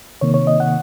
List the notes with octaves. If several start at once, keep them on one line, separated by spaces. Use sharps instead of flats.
C3 D#3 A#3 C#5
C#5
D#5
F#5